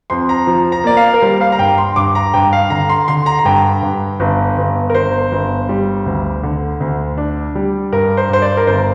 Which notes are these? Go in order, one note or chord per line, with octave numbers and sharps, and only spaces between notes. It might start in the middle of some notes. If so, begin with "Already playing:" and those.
F2 C6
A#5
F3
A#5
A#3 D5
F5
A#4
G3 C5
F5
A#5
G2 G5
C6
G2 D6
A#5
G2 G5
F5
D3 A#5
C6
D3 C6
A#5
A#5
G2 G5
G2
G1
G1
A#4
G1 C5
G1
G3
D2
D3
D2
D4
G3
G2 A#4
C5
G2 C5
D5
A#4
G1 C5